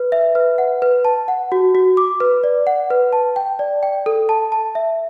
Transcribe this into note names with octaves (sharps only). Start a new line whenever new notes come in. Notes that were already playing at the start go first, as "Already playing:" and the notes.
Already playing: B4
E5
B4
F#5
B4
A5
F#5
F#4
F#4
D6
B4
D5
F#5
B4
A5
G5
D5
G5
A4
A5
A5
E5